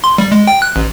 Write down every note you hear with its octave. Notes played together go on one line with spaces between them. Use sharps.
C6
G3
G#3
G5
F#6
A1